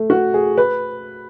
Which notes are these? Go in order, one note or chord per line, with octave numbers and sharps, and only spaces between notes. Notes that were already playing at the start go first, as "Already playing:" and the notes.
Already playing: A3
F#4
G#4
B4